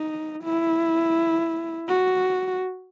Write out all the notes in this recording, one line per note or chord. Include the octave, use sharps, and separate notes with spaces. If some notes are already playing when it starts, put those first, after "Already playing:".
Already playing: D#4
E4
F#4